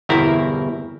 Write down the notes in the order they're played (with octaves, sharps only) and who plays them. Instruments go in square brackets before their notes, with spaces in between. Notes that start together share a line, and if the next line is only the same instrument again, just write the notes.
[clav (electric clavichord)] G1 E2 B2 C4 E4 A#4